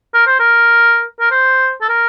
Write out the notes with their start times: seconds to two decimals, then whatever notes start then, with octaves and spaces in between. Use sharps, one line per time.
0.14 A#4
0.26 C5
0.39 A#4
1.20 A#4
1.31 C5
1.81 A4
1.89 A#4